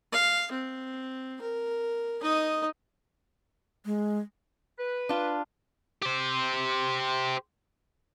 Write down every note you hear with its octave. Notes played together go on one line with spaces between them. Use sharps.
F5
C4
A#4
D#4 D#5
G#3
B4
D4 F4
G4 C5